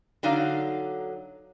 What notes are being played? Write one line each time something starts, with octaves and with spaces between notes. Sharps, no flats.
D3 F#3 D#4 D5 F5